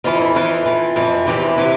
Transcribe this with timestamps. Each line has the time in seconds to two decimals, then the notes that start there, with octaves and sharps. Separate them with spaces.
0.04 F2 E3 F4
0.20 E4
0.35 F2 E3 F4
0.66 F2 E3
0.96 F2 E3
1.26 E2 C3 E3 G4
1.58 C3 E3